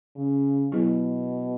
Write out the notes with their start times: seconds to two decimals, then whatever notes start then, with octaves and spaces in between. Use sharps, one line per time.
0.16 C#3
0.72 B2 F#3 B3 E4 G#4 C#5